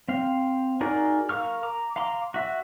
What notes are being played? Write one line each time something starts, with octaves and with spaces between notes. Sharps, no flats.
C4 F5
D#4 F#4 G#4 A#4 D5
A#4 F5 C#6 F6
A#5 D6
F5 A#5 C6 D6
F#4 E5